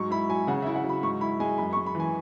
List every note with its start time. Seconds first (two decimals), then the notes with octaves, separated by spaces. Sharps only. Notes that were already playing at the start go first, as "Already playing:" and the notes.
Already playing: G#2 F#3 C#6
0.10 E4 B5
0.29 F#3 G#5
0.47 C#3 F#5
0.62 E4 E5
0.76 F#5
0.84 F#3 B5
1.03 G#2 C#6
1.21 E4 B5
1.40 G#3 G#5
1.58 F#2 B5
1.73 G#3 C#6
1.86 B5
1.95 E3 G#5